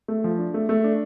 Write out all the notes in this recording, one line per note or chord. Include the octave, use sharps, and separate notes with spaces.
A3
F3
D4
A3
A3
D4